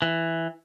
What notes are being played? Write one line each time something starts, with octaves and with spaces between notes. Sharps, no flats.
E3